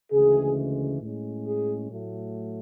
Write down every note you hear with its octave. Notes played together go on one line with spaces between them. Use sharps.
D2 C#3 E3 G#3 G#4
A2 G#3 C#4
G#4
A2 F#3 A3